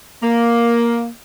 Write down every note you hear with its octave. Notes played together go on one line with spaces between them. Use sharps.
A#3